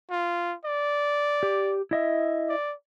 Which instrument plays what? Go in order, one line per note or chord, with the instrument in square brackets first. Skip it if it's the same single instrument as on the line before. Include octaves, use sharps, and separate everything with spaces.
[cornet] F4
D5
[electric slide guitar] G4
E4 D#5 E5
[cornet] D5